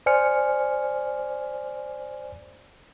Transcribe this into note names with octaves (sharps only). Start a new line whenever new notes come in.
C5 D5 G#5 F6 C#7